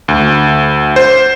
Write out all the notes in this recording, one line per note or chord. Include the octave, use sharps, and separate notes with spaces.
D2
C5